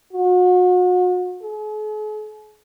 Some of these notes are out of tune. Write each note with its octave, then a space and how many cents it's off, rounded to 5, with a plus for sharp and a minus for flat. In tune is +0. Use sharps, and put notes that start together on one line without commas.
F#4 -35
G#4 +45